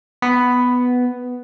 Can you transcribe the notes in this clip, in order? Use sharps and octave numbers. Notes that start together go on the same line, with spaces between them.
B3